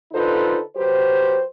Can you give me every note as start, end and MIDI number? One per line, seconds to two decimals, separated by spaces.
0.12 0.59 50
0.12 0.59 63
0.12 0.59 65
0.12 0.59 69
0.12 0.59 71
0.12 0.59 72
0.76 1.41 54
0.76 1.41 67
0.76 1.41 71
0.76 1.41 72